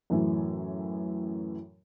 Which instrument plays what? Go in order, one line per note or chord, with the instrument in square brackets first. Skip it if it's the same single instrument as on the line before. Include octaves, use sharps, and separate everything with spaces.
[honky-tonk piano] F#2 A2 E3